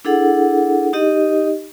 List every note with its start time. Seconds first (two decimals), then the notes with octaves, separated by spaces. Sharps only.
0.05 D4 E4 G#4 A4 F#5
0.93 D#4 G4 D#5